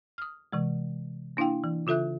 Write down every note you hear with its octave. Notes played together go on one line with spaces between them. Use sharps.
D#6 F6
C3 E3 G#3
A#3 D4 E4 F5 G5
E3
C#3 F4 A4 E5 F#6